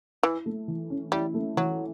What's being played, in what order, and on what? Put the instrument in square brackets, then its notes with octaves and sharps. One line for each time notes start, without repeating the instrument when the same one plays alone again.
[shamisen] E3 [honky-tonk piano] E4
[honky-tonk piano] A3
E3
C#4
[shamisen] G3 [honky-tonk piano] E4
[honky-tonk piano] A3
[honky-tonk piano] E3 [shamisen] F#3